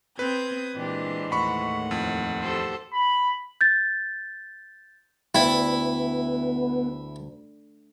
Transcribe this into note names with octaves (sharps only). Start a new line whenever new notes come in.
C4 B4 D#6 G6 G#6
A#2 E3 G#3 D4 G4 C5
D#2 A2 F#5 B5 C#6
F2
G4 A4 C5
B5
G6 A6
D2 B3 E4 G5 B5